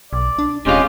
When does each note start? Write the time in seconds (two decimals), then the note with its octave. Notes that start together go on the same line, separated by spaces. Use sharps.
0.13 B1 D5
0.39 D4
0.66 D#1 C3 G#3 C#4 F4 G4